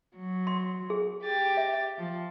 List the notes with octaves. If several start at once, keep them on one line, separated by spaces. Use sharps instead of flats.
F#3
C6
G#4
G4 A6
E5
F3